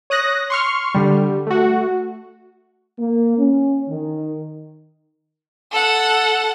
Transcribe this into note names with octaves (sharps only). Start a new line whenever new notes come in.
C#5 D#6 F#6 A#6
C6 C#6 F6
D3 G3
A3 F#4
A#3
C#4
D#3
A4 F#5